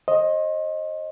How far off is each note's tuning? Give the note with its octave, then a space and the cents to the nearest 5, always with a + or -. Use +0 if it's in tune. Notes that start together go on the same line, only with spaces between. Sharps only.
C5 +35 D#5 +0